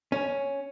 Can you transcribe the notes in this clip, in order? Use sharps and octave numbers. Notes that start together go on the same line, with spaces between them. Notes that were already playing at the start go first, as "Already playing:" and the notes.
C#4